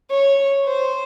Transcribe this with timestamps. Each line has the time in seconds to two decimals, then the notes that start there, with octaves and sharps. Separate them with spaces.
0.10 C#5
0.65 C5